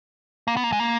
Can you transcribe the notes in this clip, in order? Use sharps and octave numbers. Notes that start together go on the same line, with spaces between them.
A#3
B3
A#3
G#3
A#3